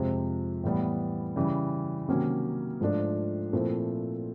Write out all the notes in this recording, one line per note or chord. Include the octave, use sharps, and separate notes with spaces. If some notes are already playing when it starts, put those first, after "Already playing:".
Already playing: F2 C3 F3 G#3
A2 E3 G3 B3
C#3 E3 G3
C3 D#3 F#3 A#3 C#4
G#2 F3 A3 D4 F4
A#2 F3 A3 C4 E4